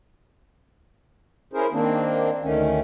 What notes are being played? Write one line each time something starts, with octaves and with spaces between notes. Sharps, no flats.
C#4 E4 G#4 A#4 C5
D#3 A#3 C4 D4
D2 D#3 A3 C#4